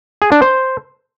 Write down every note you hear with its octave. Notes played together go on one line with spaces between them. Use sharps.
G#4
D4
C5